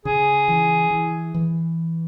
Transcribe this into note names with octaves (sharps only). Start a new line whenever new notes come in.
C#3 G#4
E3
E3
E3